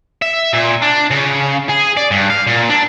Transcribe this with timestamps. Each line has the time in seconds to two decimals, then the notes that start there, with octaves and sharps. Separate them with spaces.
0.22 E5
0.54 A#2
0.82 D4
1.11 C#3
1.69 G#4
1.97 D5
2.11 G2
2.30 F5
2.47 A#2
2.69 D4